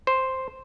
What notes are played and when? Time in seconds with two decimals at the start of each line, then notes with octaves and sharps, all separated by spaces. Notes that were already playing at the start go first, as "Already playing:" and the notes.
0.07 C5